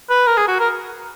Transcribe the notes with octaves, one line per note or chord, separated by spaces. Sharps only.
B4
A#4
G#4
F#4
A#4